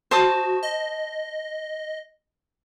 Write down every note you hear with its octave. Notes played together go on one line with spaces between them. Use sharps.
F#4 C5 A5 D#6
D#5